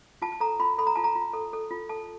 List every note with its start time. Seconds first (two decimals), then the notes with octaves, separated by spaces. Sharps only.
0.22 F4 A5
0.32 A5
0.40 A4 A#5
0.60 F4 B5
0.78 A4 B5
0.87 A#5
0.96 F4 A5
1.04 A#5
1.15 F4
1.33 A4
1.53 A4
1.71 F4
1.89 A4 A5